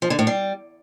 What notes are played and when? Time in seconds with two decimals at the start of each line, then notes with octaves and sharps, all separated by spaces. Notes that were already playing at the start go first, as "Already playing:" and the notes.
0.02 F3
0.10 D3
0.19 A2
0.27 G3